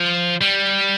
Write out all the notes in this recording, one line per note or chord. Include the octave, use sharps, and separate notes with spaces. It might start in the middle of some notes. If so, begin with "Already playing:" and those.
Already playing: F3
G3